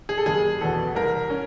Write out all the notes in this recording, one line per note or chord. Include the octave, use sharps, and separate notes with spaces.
G#4
A4
F#1 G#4
E2 B2 A4
C2 A#4
C#4